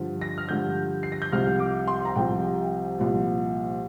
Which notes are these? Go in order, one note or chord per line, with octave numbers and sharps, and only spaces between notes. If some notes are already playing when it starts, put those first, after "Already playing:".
Already playing: G2 D3 F3
A#6
F6
G2 D3 F3 G6
C7
A#6
G6
C2 C3 F3 F6
D6
C6
A#5
C2 C3 F3 G5
C2 A#2 F3